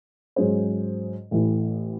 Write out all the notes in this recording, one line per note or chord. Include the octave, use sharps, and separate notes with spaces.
G#2 F#3 C#4 G#4 C5
A1 A2 E3